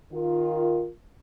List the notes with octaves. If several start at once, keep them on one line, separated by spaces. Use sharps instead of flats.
D#3 F4 A#4